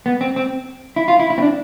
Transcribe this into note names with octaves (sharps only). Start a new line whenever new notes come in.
B3
C4
C4
E4
F4
E4
E4
C4
D4